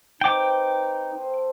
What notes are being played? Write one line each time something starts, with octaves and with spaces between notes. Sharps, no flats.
C4 D#4 B4 G5 D6
A4 C5 D#5